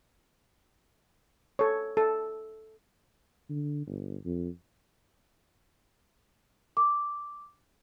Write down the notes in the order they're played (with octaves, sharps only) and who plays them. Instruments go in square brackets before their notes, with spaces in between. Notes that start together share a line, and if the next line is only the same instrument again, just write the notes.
[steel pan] A4 C#5
A4
[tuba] D3
G1
F2
[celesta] D6